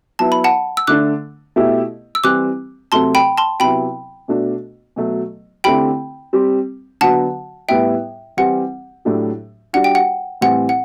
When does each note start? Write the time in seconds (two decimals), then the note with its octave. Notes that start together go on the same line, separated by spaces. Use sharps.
0.19 F#3 B3 E4 A5
0.32 B5
0.44 F#5 A5
0.77 E6
0.87 D3 A3 D4 D6 F#6
1.56 B2 A3 E4 G4
2.15 E6
2.24 E3 G3 C4 D6 F#6
2.92 C3 F#3 A3 C4 A5 C6
3.15 G5 B5
3.38 A5 C6
3.60 C3 F#3 B3 E4 G5 B5
4.28 B2 A3 D4 F#4
4.96 B2 F#3 A3
5.64 D3 A3 C4 E4 G4 G5 B5
6.33 G3 C4 G4
7.01 D3 F#3 B3 F#4 F#5 A5
7.69 A2 G3 B3 E4 E5 G5
8.37 E3 G3 C4 G4 F#5
9.05 A2 F#3 A3 D4 G4
9.73 G3 D4 F#4 F#5
9.84 G5
9.95 F#5
10.41 A2 E3 G3 C4 F#5
10.69 F#5